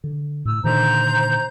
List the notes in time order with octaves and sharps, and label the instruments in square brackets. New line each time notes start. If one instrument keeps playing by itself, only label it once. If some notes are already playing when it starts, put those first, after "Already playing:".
[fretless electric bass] D3
[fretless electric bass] A2 [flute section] E6
[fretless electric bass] A#2 D3 D#3 [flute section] C5 A#5 G6